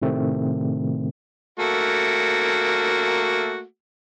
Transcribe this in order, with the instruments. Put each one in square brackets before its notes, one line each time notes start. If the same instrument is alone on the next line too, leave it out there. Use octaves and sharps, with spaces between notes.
[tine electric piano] A2 C3 D#3 A3 C4
[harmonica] A3 A#3 F#4